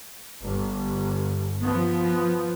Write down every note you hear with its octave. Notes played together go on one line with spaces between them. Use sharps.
G1
F3 B3